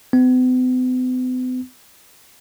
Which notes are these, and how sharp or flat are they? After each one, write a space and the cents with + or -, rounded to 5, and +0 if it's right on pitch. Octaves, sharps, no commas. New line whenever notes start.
B3 +45